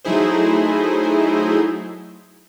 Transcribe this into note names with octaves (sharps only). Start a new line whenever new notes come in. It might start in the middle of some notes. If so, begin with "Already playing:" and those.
F#3 A3 D#4 E4 G#4 C5